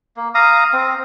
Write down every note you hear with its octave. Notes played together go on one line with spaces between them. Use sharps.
A#3
F5 A#5 D#6
C4